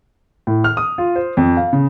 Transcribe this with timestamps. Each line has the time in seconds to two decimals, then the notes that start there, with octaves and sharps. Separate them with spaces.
0.47 A2
0.64 F6
0.77 D#6
0.98 F4
1.16 C5
1.37 F2
1.57 F5
1.73 C#3